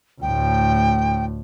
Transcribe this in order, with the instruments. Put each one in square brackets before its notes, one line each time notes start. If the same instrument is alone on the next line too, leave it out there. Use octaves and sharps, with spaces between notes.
[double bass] D2 A2 [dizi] G5